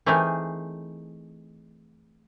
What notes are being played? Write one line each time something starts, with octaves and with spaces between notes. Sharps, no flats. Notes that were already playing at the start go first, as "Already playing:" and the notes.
E3 A3 C4 D#4 G#4 A#4